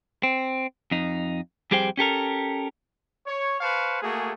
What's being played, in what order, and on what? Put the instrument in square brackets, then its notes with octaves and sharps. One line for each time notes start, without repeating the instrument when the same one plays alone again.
[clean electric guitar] C4
F2 D#4
F2 G3 G4 G#4 C5 G5
C#4 G4 A4 A#4
[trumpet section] C#5
B4 C5 F5 A5 C#6
A3 A#3 F#4 G#4